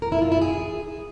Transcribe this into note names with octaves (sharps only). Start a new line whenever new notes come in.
A#4
E4
F4
E4
G#4